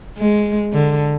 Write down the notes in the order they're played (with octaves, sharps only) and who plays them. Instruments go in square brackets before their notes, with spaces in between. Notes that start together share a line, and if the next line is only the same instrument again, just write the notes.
[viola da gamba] G#3
D3